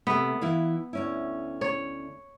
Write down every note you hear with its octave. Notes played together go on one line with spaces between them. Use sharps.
C3 A3 B3
E3 E4 F5
D2 C#4 E4
C#5